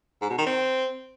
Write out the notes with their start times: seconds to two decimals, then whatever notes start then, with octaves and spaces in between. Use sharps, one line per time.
0.22 G#2
0.30 B2
0.38 D#3
0.46 C4